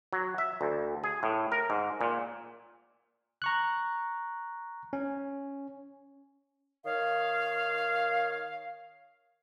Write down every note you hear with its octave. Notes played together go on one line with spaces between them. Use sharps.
F#3
E5
D2
G#4
A2
A#4
G#2
A#2
A#5 C#6 F#6
C#4
D#3 C#5 F5